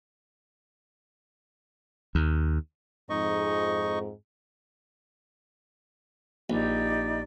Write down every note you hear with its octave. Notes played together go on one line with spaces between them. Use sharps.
D#2
F2 G#2 D#4 D#5 C#6
A#1 D#4 G4 D5